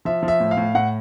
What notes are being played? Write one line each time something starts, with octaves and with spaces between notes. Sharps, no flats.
F3 E5
F3
E5
A2
F5
A2
A2 F#5